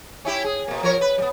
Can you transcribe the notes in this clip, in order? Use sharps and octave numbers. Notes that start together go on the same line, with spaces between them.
C#4 E4 G4
G#4
B2 A#3
F3 A#4 C#5
B4
G3 B3